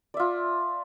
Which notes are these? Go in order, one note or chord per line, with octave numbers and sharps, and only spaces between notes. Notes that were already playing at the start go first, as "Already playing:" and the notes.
F4 D5 E5